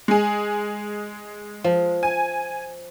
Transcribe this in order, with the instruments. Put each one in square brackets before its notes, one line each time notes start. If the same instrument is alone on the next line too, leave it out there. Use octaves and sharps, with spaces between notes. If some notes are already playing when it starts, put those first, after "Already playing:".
[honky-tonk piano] G#3 G#4
[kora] F3
[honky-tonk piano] G#5